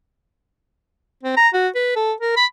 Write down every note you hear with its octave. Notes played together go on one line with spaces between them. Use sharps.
C4
A#5
F#4
B4
A4
A#4
B5